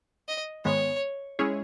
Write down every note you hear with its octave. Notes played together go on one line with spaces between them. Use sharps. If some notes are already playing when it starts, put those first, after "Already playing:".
D#5
G#2 D#3 G#3 B3 C#5
G#3 C#4 E4 G#4 C#5